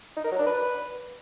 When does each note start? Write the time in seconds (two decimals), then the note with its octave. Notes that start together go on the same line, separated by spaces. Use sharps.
0.17 D#4
0.24 A#4
0.31 F#3
0.39 D4
0.46 B4